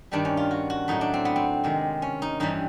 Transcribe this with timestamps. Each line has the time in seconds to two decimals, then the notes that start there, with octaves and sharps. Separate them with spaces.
0.12 G2 D#3 G3 D4
0.25 C#4
0.37 F4
0.51 F#4
0.70 F#4
0.88 A2 F#3 A3 D#4
1.01 D4
1.14 C4
1.25 B3
1.36 C4
1.64 C3 D#3 G#3
2.02 C#4
2.22 D#4
2.40 G2 E3 G3 D#4